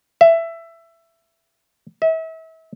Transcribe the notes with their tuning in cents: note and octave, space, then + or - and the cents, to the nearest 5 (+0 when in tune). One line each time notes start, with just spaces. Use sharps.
E5 +15
E5 -35